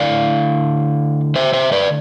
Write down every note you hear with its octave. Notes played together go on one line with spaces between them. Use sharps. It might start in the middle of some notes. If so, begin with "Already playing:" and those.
Already playing: D3 A3 E4 D5 F5
C5 E5
C5 E5
B4 D5